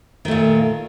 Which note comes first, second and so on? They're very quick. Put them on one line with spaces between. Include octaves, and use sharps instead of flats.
D#3 A3 A#2